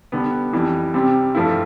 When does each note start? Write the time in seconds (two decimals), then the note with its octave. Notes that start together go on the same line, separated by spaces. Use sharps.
0.12 D3 G3 B3
0.53 F2 E3 G3
0.94 C3 G3 C4
1.35 G2 F3 A3 E4